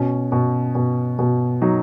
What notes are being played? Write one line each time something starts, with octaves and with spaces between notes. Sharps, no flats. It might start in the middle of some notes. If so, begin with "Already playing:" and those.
Already playing: B2 C#4
B2
B2
B2
F#3 D#4